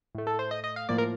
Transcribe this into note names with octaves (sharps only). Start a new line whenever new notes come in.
A2 A3
A4
C5
D#5
D#5
F5
A2 F3 A#3 D5
A#4